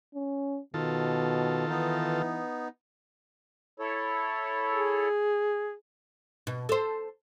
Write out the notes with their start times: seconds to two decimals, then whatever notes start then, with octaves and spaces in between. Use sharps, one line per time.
0.15 C#4
0.74 B2 D#3 F4 A4
1.69 E3 B3 D#4
3.78 E4 A4 C#5
4.72 G#4
6.47 B2
6.69 A4 C5